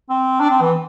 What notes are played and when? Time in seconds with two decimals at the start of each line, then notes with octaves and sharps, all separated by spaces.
0.10 C4
0.40 D4
0.50 C4
0.61 E3